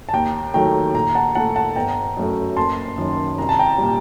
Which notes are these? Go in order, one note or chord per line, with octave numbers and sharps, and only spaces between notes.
A5
D#2 G5 A#5
D#3 F#3 A3 G5 A#5
A#1 G5 A#5
F#5 A5
A#2 A3 F#5 A5
F#5 A5
G1 G5 A#5
F#2 F#3 A3
F#1 A5 C6
F#2 D#3 F#3
C2 A#5
A5
G5 A#5
A#2 G3